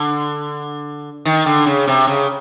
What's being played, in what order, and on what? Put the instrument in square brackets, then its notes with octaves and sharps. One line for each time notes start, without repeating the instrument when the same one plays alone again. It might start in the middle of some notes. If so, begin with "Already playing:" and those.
Already playing: [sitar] D3
D#3
D3
C#3
C3
C#3